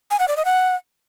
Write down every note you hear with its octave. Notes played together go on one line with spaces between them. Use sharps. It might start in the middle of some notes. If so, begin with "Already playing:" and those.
G#5
F#5
D5
D#5
F#5